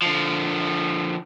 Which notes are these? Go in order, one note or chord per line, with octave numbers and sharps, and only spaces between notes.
D3 F3